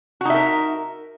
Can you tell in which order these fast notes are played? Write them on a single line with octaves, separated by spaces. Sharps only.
F#4 D#4 E5 A#4